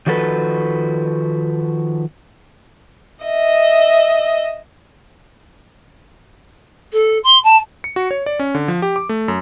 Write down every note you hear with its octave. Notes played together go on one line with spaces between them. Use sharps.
D#3 F3 F#4 A4 B4
D#5 E5
A4
C6
A5
C#7
F#4
C#5
D5
C#4
D3
F3
G4
D6
A3
F#2